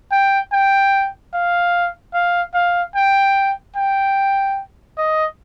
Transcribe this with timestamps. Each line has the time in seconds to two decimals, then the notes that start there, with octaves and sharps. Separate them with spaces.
0.11 G5
0.52 G5
1.33 F5
2.14 F5
2.54 F5
2.95 G5
3.76 G5
4.98 D#5